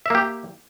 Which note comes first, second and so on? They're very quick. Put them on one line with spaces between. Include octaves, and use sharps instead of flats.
E5 A#3 G4